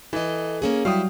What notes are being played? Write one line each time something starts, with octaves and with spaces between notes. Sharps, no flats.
E3 A4 D#5
A#3 C#4 G#4
F#3 G3 E4 F#4 G4 F5 G5 D#6